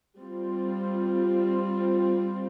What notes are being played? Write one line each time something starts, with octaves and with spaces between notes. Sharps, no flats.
G3 C4 F4